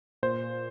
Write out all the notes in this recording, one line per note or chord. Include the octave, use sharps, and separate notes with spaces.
A#2 C5